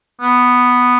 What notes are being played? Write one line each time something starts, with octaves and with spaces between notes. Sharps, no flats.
B3